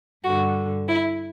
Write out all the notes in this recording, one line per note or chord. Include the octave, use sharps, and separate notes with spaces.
G2 D3 F#4
E4